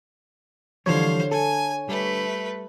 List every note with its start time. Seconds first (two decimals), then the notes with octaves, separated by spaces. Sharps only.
0.86 D3 E3 F3 G3 C5 C#5 F5
1.32 A4 G#5
1.89 G3 A3 B4